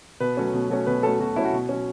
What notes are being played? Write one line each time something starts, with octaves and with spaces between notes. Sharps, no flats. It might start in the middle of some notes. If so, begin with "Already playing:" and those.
B2 B4
F#3 A3 C#4
B2
F#3 A3 C#4
B2 B4
F#3 A3 C#4 A4
B2 F#4
F#3 A3 C#4 E4
F#4
B2
F#3 C#4